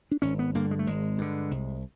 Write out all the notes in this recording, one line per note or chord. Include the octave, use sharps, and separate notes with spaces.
D4
G#1 C#4
B3
G2 D3 A#3
G#3
A3
G#1 G#3
G2 D3
C2